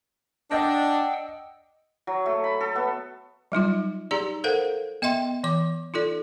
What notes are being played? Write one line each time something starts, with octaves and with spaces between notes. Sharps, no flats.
D4 D#5 F#5 G5 E6 G6 A#6
F#3
A3
B5
A4
B3
F#3 G3 D#4 F4
D#4 G4 G#4 D5 A#5
A4 A#4 C5 F5 F#5
B3 D#5 E5 G5 C6
E3 D6
D#4 F4 A4 D5